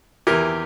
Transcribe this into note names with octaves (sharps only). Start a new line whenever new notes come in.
E2 E3 G4 A#4